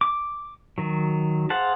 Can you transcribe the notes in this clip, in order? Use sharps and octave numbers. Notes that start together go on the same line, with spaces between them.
D6
D#3 F#3
G#4 C5 F5 F#5 A5